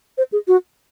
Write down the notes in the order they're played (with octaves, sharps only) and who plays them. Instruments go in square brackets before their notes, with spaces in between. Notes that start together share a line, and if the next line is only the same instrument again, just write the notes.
[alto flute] C5
G#4
F#4